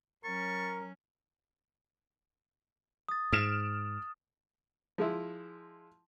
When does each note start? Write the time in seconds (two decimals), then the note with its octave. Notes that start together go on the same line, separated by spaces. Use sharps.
0.24 F#3 C#4 A#4 C#6 A6
3.09 D#6 A6
3.33 G#2 F6 D7 E7
4.98 F3 G#3 E4